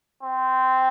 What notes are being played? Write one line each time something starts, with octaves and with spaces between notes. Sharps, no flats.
C4